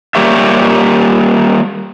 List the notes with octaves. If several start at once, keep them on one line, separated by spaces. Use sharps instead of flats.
G3 A#3 G4 C#5 E5